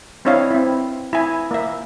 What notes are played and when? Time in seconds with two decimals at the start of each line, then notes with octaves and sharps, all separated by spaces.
0.25 C4 D4 E4 C#5 D#5 F5
0.51 C4 E4
1.13 E4 G#5
1.51 A#3 E5